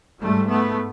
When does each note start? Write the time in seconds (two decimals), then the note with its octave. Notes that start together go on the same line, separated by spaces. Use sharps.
0.20 G#2 G3 A3
0.47 A3 B3